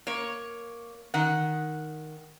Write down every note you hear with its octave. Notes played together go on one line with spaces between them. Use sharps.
A#3 C#5
D#3 F#5